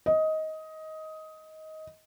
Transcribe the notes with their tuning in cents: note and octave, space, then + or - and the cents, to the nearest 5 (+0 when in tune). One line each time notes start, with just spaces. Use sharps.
D#5 +15